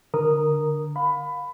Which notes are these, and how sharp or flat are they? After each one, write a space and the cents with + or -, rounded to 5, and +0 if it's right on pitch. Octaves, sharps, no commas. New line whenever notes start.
D3 +0 A#4 +0 D#6 -10
F5 +30 B5 +15